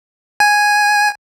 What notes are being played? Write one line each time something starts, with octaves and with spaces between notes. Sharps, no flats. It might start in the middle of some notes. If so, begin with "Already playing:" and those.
G#5